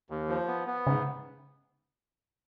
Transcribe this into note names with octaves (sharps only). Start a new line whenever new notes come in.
D#2
F3
B3
B3
G#2 C#3